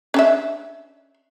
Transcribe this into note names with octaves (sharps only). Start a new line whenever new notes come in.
C#4 D4 E5